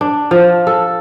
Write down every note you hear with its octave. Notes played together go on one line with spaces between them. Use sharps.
D4
F3
A4